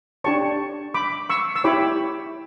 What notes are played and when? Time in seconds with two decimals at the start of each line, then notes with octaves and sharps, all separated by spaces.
0.24 D4 G4 C#5 A5 C#6
0.94 B5 D6
1.30 C#6 E6
1.56 E6
1.64 E4 G4 C#5 B5 D6